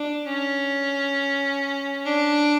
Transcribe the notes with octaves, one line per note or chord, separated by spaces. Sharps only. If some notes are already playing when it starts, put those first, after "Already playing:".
Already playing: D4
C#4
D4